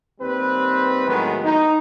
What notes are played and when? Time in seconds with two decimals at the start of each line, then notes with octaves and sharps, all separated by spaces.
0.21 D#2 G3 C4 B4
1.08 A2 D#3 F#3 G#3 B3
1.44 D#4